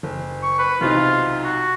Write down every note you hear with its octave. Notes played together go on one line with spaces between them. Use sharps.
F#1
C#6
B4
B1 C3 D#4 F4
F#4